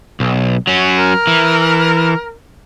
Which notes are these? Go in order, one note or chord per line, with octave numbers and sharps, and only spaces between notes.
B1
F#3 C#4
A#4
E3